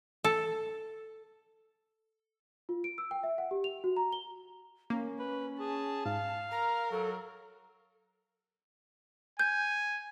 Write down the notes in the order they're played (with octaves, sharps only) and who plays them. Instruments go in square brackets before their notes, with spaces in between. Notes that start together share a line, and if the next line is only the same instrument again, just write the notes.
[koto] A4
[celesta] F4
D7
E6
G5
E5
F#5
G4
F7
F#4
A#5
G7
[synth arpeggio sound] A#3 [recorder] C#4
[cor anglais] B4
[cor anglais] G#4 [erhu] A5
[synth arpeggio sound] G#2 [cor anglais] F5
[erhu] A#4 [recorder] A#5
[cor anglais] F#3 [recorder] A4
[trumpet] G#5 [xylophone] G6